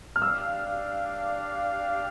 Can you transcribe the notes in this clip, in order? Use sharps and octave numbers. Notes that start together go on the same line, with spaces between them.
F6
D4 G4 D5 F5 E6